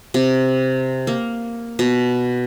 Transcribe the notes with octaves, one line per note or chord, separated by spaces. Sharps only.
C3
A#3
B2